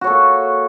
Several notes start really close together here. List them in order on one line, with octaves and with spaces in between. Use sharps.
F#4 C#5 A4 A#3